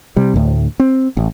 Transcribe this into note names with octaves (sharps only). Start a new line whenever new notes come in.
C3 G3
D2 A2
C4
A1